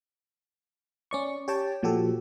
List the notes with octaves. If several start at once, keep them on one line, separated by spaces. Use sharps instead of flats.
C#4 D5 C#6
G4 C#5 G5 A5
A#2 F3 F#4 G4 A4